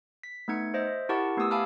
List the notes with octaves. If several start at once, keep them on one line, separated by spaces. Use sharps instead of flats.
B6
A3 B3 D#4 G#6 C#7
C5 D#5 E5
E4 G4 A#4 F#5 A5 C#6
A3 B3 G4 D#6 E6
F5 G#5 A5 B5 D6 F6